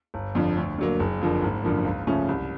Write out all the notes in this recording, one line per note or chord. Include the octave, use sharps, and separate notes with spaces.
G1
F2 D3 F3
D2
D3 F#3 A#3
F#1
F2 D3 F3 A#3
G#1
F#2 D3 F3 A#3
C#2
C#3 F3 A3 C#4
C2